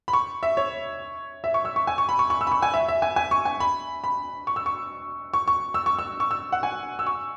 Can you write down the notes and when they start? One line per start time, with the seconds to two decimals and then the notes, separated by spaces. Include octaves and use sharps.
0.08 B5
0.13 C#6
0.43 E5
0.57 C#5
1.44 E5
1.54 C#6
1.65 E6
1.76 C#6
1.87 G#5
1.98 C#6
2.09 B5
2.19 C#6
2.30 C#6
2.41 E6
2.47 B5
2.52 C#6
2.62 G#5
2.74 E5
2.88 E5
3.02 G#5
3.16 G#5
3.31 C#6
3.45 G#5
3.60 B5
4.04 B5
4.47 C#6
4.56 E6
4.66 C#6
5.34 C#6
5.48 C#6
5.74 E6
5.86 C#6
5.99 E6
6.20 C#6
6.31 E6
6.52 F#5
6.63 G#5
6.99 E6
7.07 C#6